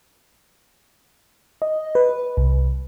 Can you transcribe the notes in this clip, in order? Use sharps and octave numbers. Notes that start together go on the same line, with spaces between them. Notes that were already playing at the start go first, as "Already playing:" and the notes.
D#5
B4
C2